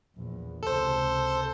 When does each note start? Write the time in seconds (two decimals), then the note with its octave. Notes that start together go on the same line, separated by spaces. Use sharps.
0.15 A#1 E2
0.63 C#2 C3 A4 C5